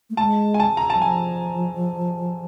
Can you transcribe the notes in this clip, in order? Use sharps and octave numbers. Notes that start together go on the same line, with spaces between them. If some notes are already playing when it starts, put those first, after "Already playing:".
A3
G#3 A5
G#5
A5
A#5
A5
F#3
F3 G#5